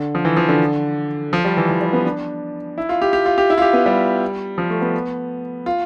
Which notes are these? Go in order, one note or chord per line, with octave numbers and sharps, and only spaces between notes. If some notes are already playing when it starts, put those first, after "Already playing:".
Already playing: D3
F3
E3
F3
D3
F3
G3
E3
E3
G3
B3
D4
E4
F4
G4
G4
F4
G4
E4
F4
G4
B3
G3
F3
A3
B3
F4